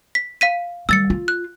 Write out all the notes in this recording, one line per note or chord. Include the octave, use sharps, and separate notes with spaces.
B6
F5 B6 D#7
D#3 G3 E6 A6 C#7
F4
F#6